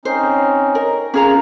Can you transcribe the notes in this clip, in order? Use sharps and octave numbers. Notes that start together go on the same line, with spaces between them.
C4 C#4 D#4 C5
A#4
C#4 F4 G#4 A#4 A#5